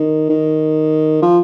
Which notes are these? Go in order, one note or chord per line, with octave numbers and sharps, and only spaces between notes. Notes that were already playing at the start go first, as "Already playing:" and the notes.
Already playing: D#3
D#3
F3